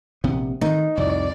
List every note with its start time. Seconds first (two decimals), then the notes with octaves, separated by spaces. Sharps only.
0.24 A#1 C3 B3
0.61 D3 D#3 F#3 D#4
0.97 C2 F2 A2 D5